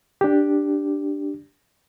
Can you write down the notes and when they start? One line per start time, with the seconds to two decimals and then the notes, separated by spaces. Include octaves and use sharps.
0.21 D4 G4